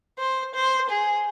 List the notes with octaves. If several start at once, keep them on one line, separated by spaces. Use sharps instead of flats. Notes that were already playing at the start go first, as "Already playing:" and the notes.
C5
C5
G#4